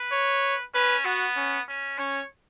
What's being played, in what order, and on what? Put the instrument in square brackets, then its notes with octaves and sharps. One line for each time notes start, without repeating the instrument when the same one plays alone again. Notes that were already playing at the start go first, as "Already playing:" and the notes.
Already playing: [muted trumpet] B4
[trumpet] C#5
[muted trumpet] C#4 [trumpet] B4
[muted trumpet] B3 [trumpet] F#4
[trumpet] C#4
[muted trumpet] C#4
[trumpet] C#4 [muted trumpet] C#5